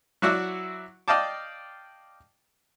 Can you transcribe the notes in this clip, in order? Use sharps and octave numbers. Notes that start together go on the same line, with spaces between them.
F#3 E4 F#4 D5 E5 F#5
D5 D#5 F5 G5 A5 D6